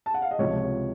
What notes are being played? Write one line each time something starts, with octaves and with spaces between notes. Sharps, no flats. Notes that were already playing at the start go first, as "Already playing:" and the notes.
A5
F#5
F5
D#5
C#2 C3 F3 C#5